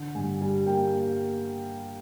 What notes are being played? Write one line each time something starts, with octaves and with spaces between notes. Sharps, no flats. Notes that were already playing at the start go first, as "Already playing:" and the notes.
Already playing: D3
G2 G#5
G3 G#5
A#3 G5